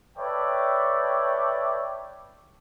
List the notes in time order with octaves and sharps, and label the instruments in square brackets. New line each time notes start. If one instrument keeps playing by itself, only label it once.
[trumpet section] A4 B4 C#5 D5 E5 G5